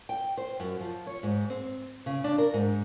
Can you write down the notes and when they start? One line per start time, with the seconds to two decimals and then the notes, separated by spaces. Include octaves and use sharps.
0.09 G5
0.37 C5
0.60 F#2
0.81 F3
1.07 C#5
1.23 G#2
1.50 C4
2.06 C#3
2.24 D4
2.38 A#4
2.54 G#2